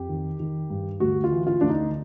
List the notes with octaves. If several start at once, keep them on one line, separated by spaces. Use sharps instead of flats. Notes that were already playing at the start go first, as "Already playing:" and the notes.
Already playing: F2 G4
D#3
D#3
G2
D2 F#4
F4
E3
F4
D2 D4
D#4